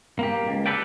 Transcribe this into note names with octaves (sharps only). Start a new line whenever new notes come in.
A#3 G4
C#2
G4 A4 B4 D5 G5